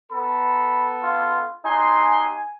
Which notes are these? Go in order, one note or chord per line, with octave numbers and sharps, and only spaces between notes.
B3 A4 B5
F4
D#4 G4 G#5 C6